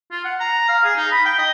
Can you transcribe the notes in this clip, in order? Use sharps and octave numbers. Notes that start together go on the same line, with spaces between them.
F4
F#5
A#5
F5
G#4
D#4
B5
G5
D#5